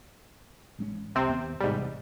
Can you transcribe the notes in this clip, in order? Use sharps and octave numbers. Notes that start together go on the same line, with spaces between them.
A1 G#3 C#4
C2 C3 C4
D#2 B3
E1 A1 G#2 C3 G3